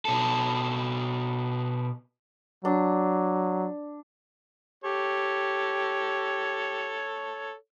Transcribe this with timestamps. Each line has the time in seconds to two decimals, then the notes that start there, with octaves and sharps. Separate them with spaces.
0.05 B2 A4
2.65 F#3 D4
4.84 G4 A4 C#5